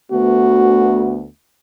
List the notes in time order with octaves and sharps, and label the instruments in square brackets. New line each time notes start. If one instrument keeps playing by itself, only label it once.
[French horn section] D2 A3 B3 [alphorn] F#4